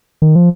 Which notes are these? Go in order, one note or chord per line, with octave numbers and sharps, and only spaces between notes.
D#3
F3